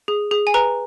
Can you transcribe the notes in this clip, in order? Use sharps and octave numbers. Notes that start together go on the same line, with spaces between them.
G#4
G#4
G#5
B4 A#5